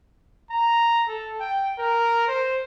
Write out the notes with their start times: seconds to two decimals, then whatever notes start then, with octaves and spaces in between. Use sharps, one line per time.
0.51 A#5
1.08 A4
1.40 G5
1.79 A#4
2.28 C5